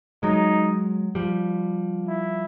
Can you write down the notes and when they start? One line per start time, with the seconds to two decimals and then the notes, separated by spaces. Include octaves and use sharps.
0.23 F#3 G#3 D#4
1.15 F3 G3
2.08 E4